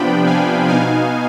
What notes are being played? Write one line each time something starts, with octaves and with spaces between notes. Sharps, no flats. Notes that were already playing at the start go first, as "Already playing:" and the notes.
Already playing: C3 F3 B3 D4 G5 B5
F5 G#5
B2 B3 D#4 F5 G#5